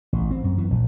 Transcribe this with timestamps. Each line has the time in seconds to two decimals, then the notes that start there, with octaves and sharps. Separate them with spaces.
0.13 A1
0.31 C4
0.44 F#2
0.58 E3
0.70 A#1